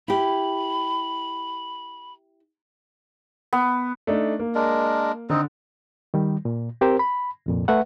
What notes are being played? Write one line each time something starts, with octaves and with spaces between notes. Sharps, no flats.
E4 G4 B5
B3
A3 D4 D#4
A#3
G#3 D4 A#4
D3 C4 D#4
D#3 G3
A#2
C4 G4 A#4 C5
B5
C2 F2 A#2
A3 B4 E5 F#5